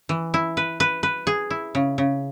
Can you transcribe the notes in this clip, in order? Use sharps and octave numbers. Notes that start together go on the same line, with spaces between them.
E3
E4
B4
B4
B4
G#4
E4
C#3
C#3